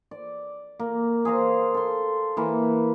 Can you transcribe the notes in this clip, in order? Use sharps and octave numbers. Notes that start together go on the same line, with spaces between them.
D5
A#3
G#4 C5 F5 A#5
A4 C6
E3 A#3 B4